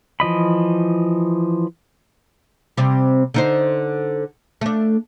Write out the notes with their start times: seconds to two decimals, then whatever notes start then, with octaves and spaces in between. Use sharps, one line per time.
0.20 E3 F3 D#5 B5
2.77 C3 G3
3.34 D3 D#4 C5
4.61 A3 D4